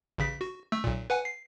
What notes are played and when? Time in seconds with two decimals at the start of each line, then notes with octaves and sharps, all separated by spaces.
0.18 A1 C#3 B6
0.41 F#4
0.72 A3 E6
0.84 B1 A#2
1.10 B4 F#5 G#5
1.25 C7